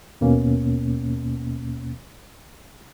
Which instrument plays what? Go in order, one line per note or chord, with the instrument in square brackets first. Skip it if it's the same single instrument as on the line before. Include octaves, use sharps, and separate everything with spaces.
[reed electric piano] D#2 B2 A#3 C#4